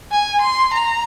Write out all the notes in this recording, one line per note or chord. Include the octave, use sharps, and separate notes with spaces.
G#5
C6
A#5